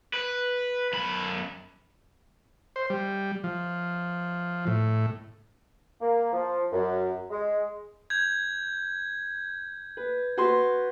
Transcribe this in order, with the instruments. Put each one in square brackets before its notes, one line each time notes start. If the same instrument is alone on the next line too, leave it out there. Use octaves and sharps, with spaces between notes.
[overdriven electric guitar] B4
F#2 B5
[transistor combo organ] C5
G3
F3
A2
[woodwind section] A#3
F3
F#2
G#3
[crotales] G6 G#6
[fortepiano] B4
F#4 B4 C6